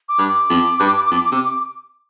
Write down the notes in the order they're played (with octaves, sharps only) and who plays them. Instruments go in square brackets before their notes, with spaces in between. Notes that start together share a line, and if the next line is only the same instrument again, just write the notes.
[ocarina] D6
[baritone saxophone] G2
[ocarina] D6
[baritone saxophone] F2
G2
F2
C3